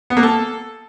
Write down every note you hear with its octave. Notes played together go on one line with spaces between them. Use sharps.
B3
A#3
A4